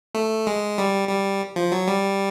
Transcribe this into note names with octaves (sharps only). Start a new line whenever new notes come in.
A3
G#3
G3
G3
F3
F#3
G3